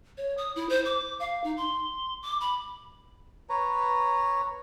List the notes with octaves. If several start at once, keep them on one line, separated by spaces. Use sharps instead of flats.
C#5
D#6
E4
C5
D6
F5
D#4
C6
D6
B5
B4 C#5 A#5